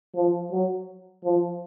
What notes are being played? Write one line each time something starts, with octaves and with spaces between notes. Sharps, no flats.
F3
F#3
F3